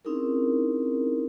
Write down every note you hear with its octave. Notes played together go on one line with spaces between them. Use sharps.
C4 C#4 D#4 E4 G#4 A#4